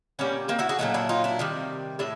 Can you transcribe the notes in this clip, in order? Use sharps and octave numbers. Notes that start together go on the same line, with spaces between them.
A#2 G3 B3 C#4
A#3 C4
E4 F#4
F#4 G#4
A#2 F#3 A3 C#4 D#4
D4 E4
D#4 F4
D4 E4
C3 D#3 G3
A2 D4 E4